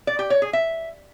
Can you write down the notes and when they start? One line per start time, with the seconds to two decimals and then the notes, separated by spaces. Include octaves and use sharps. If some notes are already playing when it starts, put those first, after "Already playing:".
0.07 D5
0.19 G4
0.30 C#5
0.42 G#4
0.53 E5